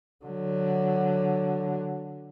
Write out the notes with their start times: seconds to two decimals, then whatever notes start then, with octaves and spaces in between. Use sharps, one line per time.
0.25 D3 F#3